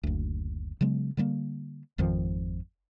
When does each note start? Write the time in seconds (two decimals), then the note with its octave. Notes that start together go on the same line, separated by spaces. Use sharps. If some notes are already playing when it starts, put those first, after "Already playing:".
0.03 F#1 D2
0.81 C#3 F#3 G#3 B3
1.17 D3 G3 A3 A#3
1.98 G#1 F2 D#3 F3